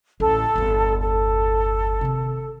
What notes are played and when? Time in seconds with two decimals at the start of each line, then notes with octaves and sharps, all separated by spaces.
0.20 A1 D2 A4
0.56 G1 E2
1.01 A4
2.01 C3 D#3